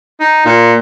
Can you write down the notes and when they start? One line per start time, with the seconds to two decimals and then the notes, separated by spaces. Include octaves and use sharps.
0.20 D#4
0.45 A#2